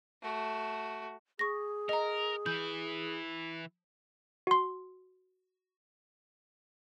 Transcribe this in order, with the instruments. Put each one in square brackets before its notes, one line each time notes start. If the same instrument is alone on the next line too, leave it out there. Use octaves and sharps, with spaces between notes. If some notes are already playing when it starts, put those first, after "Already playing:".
[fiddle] A3 F#4
[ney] G#4 [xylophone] C#6 A#6
[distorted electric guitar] A#4 [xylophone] D#5 A#5
[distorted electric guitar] E3 E4 [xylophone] G6
[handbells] F#4 C6